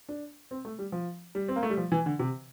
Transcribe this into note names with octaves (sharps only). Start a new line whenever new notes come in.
D4
C4
A3
G3
F3
G3
C4
A#3
A3
G3
F3
E3
D3
C3